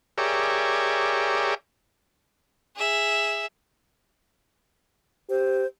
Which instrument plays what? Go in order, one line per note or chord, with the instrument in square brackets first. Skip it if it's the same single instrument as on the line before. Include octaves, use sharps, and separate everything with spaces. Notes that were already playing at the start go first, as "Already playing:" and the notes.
[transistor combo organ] G4 G#4 A#4 C#5 D5 E5
[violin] G#4 E5
[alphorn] G4 [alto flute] C5